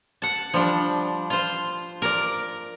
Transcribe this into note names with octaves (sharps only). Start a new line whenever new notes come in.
F#5 A5
F3 G3 D4
F4 C5
A#4 D5